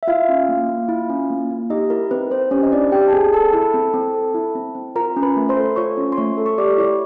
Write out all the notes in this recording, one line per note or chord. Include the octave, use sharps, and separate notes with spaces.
E5
E4 F4 F5
C#4
A#3
A#3
E4
C#4
A#3
A#3
D#4 G4 D#5
E4 A#4
C4 B4
C4 C5
C#4 G4 C#5
D#5
D4 E4 D5
C4 G4 G5
A5
C4 G#4 G#5
A4 A5
E4
C4
C4
A4
E4
C4
C4
F4 A#4 A#5
C#4
B4 B5
A3
C5 C6
A4
F4 C#5 C#6
C#4
C6
A3 C#5 C#6
A4
C#6
G4 D5 D6
E4 C#5 C#6